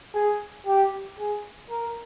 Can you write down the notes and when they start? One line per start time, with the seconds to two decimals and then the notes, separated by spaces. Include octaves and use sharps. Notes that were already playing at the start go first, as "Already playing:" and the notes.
0.15 G#4
0.67 G4
1.18 G#4
1.70 A#4